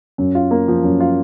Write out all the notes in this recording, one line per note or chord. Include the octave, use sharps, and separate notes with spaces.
F#2
F4
A#3
F3
F#2
F4